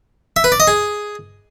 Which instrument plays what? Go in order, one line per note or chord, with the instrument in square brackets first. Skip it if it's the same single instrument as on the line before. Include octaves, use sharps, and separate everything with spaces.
[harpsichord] E5
B4
D5
D#5
G#4